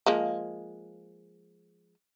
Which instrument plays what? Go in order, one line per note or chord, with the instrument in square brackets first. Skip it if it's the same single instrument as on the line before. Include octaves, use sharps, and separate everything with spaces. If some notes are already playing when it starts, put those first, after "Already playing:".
[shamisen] F3 G#3 A#3